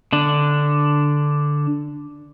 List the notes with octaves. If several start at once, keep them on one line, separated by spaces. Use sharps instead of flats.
D3 D4